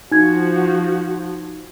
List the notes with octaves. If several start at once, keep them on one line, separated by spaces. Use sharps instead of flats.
F3 D#4 F#4 G#6